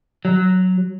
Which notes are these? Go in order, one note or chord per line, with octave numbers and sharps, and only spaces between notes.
F#3